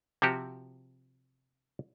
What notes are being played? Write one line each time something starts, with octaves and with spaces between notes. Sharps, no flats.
C3 F3 C4 F#4 G4